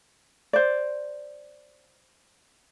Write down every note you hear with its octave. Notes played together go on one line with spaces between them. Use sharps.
C5 D5